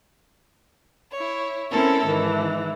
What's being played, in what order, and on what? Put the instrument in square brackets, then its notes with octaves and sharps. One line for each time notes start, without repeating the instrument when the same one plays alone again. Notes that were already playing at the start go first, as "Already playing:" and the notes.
[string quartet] E4 C#5
C4 C#4 E4 A4 A#4
G#2 D#3 E3